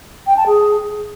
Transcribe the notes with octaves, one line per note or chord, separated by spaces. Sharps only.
G5
A5
G#4